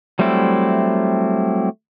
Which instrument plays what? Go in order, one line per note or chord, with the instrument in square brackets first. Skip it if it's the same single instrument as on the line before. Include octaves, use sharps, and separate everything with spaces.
[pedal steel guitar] F#3 G3 A3 C4 E4